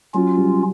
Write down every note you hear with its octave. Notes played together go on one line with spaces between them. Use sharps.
F#3 C#4 F4
C2